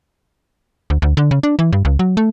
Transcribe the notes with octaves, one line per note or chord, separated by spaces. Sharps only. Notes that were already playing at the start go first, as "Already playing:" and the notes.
D2
D2
D3
C#3
D4
E3
G2
C#2
F#3
A3